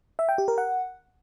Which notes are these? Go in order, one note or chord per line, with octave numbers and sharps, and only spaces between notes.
E5
G5
G4
A#4
F#5